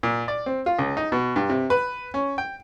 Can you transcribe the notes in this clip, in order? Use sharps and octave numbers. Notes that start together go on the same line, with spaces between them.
A#2
D5
C4
F4
C#2
D#4
B2
G2
C3
B4
C#4
G5